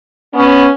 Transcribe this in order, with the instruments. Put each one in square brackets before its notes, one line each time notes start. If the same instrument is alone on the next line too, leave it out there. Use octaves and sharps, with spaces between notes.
[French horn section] B3 C#4